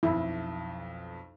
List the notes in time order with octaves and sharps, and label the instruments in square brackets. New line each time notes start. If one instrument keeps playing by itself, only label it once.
[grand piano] B1 F2 [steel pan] E4